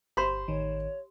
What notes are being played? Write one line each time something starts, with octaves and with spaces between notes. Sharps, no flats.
G1 G4 C5 B5 C6
A1 D#3 C#5